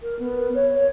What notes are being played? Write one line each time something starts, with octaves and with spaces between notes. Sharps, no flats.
A#4
B3
C#5
C#5